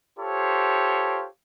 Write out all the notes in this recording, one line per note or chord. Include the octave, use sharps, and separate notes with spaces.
F4 G4 A4 C5 C#5